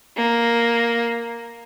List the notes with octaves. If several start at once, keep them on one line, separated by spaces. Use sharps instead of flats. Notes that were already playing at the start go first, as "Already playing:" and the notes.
A#3